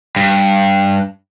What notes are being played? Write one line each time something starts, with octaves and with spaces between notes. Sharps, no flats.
G2